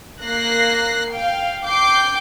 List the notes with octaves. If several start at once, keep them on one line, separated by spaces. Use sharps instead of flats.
A#3 F#6 A#6 C7
F5 G5
G5 D6 G6 C7